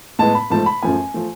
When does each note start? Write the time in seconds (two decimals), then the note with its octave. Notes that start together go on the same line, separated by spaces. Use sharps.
0.19 A2 G#3 B3 A5
0.35 B5
0.50 G#2 F3 A3 A5
0.66 B5
0.83 F#2 F3 A3 G#5
1.14 F3 A3